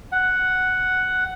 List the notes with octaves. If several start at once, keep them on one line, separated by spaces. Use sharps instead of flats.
F#5